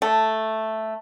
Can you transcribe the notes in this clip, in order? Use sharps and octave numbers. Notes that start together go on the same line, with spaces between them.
A3